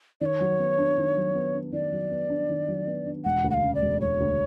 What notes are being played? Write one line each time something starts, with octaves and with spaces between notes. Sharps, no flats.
D#3 C#5 D5
F#3
B3
D4
D#3
F#3
B3
D4
D#3 D5
F#3
B3
D4
D#3
F#3
B3
D4
E1 F#5
D2
F#5
F5
C#3
D5
E1
E1 C#5
D2